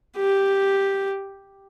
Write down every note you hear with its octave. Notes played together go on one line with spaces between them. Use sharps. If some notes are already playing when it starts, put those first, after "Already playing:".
G4